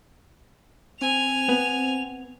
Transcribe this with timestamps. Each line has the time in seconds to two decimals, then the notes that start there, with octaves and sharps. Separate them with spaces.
1.01 C4 G#5 F7
1.49 B3